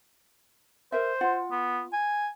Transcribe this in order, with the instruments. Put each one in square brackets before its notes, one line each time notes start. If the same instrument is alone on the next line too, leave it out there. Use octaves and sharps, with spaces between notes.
[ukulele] A#4 E5 [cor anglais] C5
[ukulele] F4 F#5
[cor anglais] B3
G#5